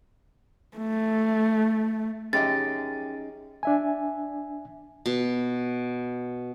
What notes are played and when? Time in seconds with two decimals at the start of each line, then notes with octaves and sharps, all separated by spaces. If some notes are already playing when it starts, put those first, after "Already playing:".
0.78 A3
2.33 F#2 C#4 D#4 G4 G#4 D#5 A6
3.63 D4 E5 G#5
5.06 B2